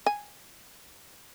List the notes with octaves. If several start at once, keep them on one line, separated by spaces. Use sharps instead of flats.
G#5